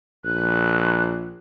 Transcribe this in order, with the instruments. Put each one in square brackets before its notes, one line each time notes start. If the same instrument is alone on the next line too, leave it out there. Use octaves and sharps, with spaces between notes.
[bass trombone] A#1 [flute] F#6